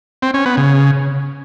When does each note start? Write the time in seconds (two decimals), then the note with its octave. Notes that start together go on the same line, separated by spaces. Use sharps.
0.22 C4
0.34 C#4
0.46 B3
0.57 C#3